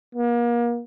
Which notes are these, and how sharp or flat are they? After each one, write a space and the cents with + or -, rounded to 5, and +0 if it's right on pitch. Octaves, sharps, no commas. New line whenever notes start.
A#3 +35